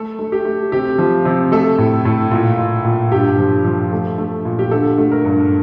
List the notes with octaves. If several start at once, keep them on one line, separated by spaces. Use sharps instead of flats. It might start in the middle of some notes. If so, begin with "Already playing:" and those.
Already playing: A3 A4
A3
G4
A3
C3 G4
F3
C3
A3 A4
A2
A2
A#2
A#2
A#2
G2 G4
F3
F3
A3
A3
A#2
G4
D3 A4
A3
A#4
G2